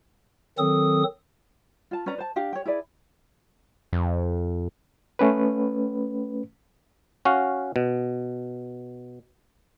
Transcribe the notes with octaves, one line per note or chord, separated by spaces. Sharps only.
D#3 F#3 C4 A4 D#6
F4 A5
C#4 B4 D5 A#5
C5 A5
D4 G4 F5 G5
C#5 G5
E4 G#4 B4 D5
F2
A3 C#4 B4
C#4 F#4 F5
B2